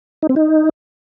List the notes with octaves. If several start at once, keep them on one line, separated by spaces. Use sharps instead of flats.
D#4
C4
D#4